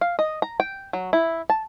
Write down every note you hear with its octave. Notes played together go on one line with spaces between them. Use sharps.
F5
D#5
A#5
G5
F#3
E4
A5